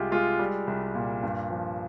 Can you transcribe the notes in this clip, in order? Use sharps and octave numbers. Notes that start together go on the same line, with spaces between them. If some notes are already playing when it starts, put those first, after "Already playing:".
Already playing: C2 G#3 F4 G4
G#3 F4
G3
C2
A#2
G2
F3